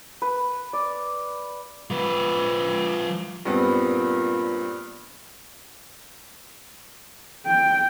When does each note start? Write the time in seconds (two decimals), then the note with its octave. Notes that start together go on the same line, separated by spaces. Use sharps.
0.22 B4
0.73 D5
1.90 F3 B4
3.45 G2 A#2 B3 C4
7.46 G5